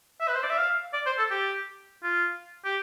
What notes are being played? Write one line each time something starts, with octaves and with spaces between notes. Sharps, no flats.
E5
B4
C5
D5
E5
F5
D5
C5
A4
G4
F4
G4